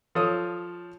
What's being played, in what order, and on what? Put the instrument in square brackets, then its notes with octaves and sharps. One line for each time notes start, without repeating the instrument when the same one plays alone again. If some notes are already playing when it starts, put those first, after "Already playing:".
[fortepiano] F3 A4 C#5 D#6